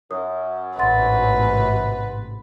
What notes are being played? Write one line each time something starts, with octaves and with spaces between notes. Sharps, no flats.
F#2 D#6
A1 G#2 C3 B4 F#5 C6 A6